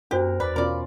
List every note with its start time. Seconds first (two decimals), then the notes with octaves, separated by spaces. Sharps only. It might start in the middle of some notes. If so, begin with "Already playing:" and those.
0.11 F#2 B3 D4 F#4 G4 A#4 C5
0.40 E2 B4 D5 B5
0.56 B2 C#4 F4 A#4 D5